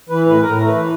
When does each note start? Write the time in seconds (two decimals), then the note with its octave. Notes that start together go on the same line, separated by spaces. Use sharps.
0.09 E3 B4
0.26 A2 B4
0.41 A2 A#4
0.58 A3 A#4
0.66 B4
0.74 E3